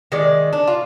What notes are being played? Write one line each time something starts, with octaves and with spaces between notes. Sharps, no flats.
D#3 G#3 D5
D4
F4